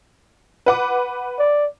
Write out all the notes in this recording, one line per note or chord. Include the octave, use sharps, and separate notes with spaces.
B4 F#5 D6
D5